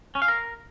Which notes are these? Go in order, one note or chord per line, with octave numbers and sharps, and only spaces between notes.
C#4
F5
A#4